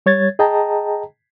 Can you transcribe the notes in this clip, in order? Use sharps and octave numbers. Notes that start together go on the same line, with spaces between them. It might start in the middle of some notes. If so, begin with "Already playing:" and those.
G3 C#5 G#6 A6
G#4 D#5 G5 A5 A#5